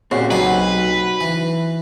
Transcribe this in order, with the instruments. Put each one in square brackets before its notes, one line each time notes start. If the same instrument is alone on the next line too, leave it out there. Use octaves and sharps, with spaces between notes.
[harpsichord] A#2 [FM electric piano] G#3 C#4 C7 [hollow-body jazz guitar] C4 F#4 G4
[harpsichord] B1 F#3 G#5 [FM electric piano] D#4 C7 [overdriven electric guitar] B4
[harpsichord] E3